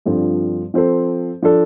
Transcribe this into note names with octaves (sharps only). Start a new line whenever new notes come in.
G2 D3 F3 C4 F4
F3 C4 A4 C5
F3 D4 A4